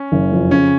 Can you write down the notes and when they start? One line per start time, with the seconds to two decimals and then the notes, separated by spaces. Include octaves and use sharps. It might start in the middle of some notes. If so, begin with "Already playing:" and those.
Already playing: C#4
0.12 F#1
0.32 F2
0.50 C#3 C#4